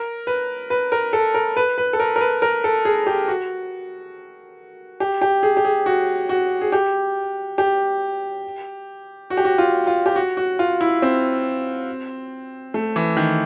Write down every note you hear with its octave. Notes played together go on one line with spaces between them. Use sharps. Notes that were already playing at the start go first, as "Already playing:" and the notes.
Already playing: A#4
B4
B4
A#4
A4
A#4
B4
B4
A4
A#4
A#4
B4
A#4
A4
G#4
G4
F#4
G4
G4
G#4
G4
G#4
F#4
F#4
G#4
G4
G4
F#4
G4
F#4
F4
F4
G4
F#4
F#4
F4
E4
C4
A3
E3
D#3